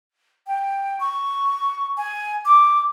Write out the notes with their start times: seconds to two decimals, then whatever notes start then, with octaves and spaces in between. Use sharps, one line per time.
0.47 G5
1.00 C#6
1.97 G#5
2.46 D6